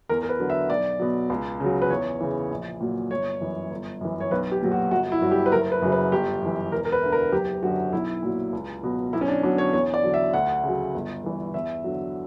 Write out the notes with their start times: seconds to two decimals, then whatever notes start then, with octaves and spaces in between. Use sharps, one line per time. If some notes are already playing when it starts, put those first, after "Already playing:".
0.09 E2 A#4
0.23 A#4
0.29 B4
0.39 D3 F#3
0.50 E5
0.70 B1 D5
1.00 B2 F#3
1.30 C#2
1.60 C#3 F#3
1.82 B4
1.90 E2 C#5
2.21 C#3 E3
2.51 A#1
2.81 A#2 F#3
3.11 G1 C#5
3.41 F#2 E3
3.71 G1
4.01 F#2 E3
4.20 C#5
4.31 B1 B4
4.51 G4
4.61 A#2 F#3
4.72 F#4
4.91 G1 F#4
5.12 E4
5.22 G2 F#3
5.31 G4
5.46 B4
5.52 F#1 A#4
5.72 B4
5.82 F#2 C#3 F#3
5.92 B4
6.12 G1 G4
6.42 F#2 E3
6.72 E1 A#4
6.85 A#4
6.92 B4
7.03 D2 D3
7.12 A#4
7.32 F#1 G4
7.63 F#2 D3 F#3 F#4
7.93 B1 E4
8.23 A#2 F#3
8.53 C#2
8.83 B2 F#3
9.13 B1 E4
9.21 C#4
9.28 D4
9.43 B2 F#3 D4
9.58 C#5
9.73 E2 C#5
9.94 D5
10.03 D3 F#3
10.14 E5
10.34 D2 F#5
10.64 C#3 F#3
10.94 G1
11.24 G2 E3
11.54 E2 E5
11.84 D3 F#3